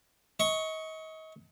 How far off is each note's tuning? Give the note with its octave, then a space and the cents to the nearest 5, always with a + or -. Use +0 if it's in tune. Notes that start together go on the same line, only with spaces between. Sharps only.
D#5 +35 C#6 +0